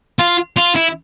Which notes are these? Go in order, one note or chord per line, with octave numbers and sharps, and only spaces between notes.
F4
F4
E4